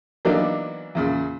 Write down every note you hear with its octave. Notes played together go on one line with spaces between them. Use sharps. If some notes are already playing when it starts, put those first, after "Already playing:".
E3 F#3 A#3 B3 D4 D#4
E2 A#2 C#3